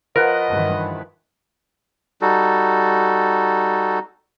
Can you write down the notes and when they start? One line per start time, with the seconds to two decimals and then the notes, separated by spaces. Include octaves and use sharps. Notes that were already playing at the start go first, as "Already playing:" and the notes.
0.16 F3 A#4 B4 D#5 F#5
0.48 G2 D#3 E3
2.22 G3 D#4 F#4 A4